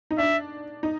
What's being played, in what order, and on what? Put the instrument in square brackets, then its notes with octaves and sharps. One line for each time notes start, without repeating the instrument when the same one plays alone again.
[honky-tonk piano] D#4
[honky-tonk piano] D4 [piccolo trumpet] E5
[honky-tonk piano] D#4